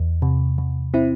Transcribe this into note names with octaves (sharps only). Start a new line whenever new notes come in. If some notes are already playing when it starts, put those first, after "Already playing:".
Already playing: E2
C3
C3
C4 E4